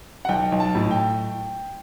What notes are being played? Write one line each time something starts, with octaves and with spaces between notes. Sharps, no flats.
F#5
B1 G5
B1
A5
A2
G5